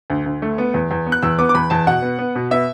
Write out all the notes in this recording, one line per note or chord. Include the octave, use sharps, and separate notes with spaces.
D2
D2
A3
B3
E2
E2
B3
F#6
E2 E6
B3 D6
D6
E2 B5
E2 A5
B2 F#5
B3
B3
B2
B3 E5